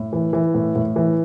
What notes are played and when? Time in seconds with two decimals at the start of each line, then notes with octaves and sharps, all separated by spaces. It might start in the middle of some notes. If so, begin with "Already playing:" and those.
Already playing: A2
0.13 E3
0.33 E3
0.54 A2
0.76 A2
0.96 E3